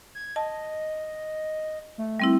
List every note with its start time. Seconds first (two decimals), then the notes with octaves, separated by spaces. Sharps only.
0.15 G#6
0.36 D#5 A5
1.98 A3
2.20 G3 C4 E4